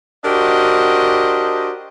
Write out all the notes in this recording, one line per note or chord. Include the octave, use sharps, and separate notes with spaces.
D4 F#4 G4 A#4 C5 D#5